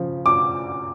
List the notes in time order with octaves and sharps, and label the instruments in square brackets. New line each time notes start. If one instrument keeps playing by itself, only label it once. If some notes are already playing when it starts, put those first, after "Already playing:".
Already playing: [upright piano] C#3 F3
D6